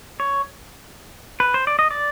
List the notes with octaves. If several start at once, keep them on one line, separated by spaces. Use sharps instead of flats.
C#5
B4
C5
D5
D#5
D5